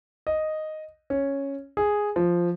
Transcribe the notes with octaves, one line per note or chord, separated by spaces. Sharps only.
D#5
C#4
G#4
F3